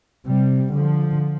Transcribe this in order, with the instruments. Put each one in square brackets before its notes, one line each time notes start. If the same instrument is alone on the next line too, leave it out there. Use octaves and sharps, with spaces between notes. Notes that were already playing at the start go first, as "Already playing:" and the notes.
[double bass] C3 [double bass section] G3
[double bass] D3 [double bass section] F3